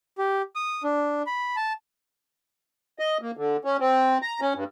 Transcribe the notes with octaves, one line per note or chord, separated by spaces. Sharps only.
G4
D#6
D4
B5
A5
D#5
A#3
D3
C#4
C4
A#5
C#4
G2